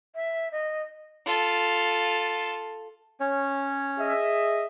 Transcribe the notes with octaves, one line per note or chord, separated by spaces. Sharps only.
E5
D#5
F4 A4
C#4 C#5
G#4 D#5 E5